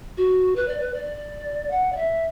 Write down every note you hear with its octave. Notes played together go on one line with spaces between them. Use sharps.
F#4
B4
D5
B4
D5
F#5
D5
E5